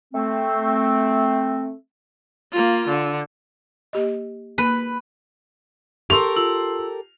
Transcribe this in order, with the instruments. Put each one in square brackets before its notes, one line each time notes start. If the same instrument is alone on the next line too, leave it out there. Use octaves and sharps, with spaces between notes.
[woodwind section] A3 C4
[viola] A#3 F4
D3
[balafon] A#3 G4 D#5
[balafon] A#3 [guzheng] B4
[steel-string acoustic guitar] G4 A4 A#4 [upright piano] C6 F7 [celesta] C#6 E6
[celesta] F4 E6 F#7